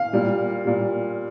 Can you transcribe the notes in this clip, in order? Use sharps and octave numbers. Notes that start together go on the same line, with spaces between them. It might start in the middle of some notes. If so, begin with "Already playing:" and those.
Already playing: F5
A#2 G3
A#2 G3